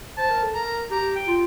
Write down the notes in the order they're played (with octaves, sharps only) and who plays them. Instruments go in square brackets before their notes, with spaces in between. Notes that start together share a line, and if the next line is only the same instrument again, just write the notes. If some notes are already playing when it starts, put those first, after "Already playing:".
[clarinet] C5 [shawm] A5
[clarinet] A#4
A4
[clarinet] A#4 [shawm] A#5
[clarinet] G4 [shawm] A#5
[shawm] G5
[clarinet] F4